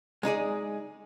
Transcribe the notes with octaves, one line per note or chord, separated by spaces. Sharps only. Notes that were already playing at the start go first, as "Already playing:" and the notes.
G#3 D#4 G#4 D5